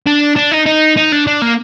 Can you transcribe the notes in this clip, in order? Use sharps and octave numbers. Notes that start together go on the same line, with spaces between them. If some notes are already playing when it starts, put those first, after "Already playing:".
D4
D4
D#4
D#4
D#4
D4
D4
A#3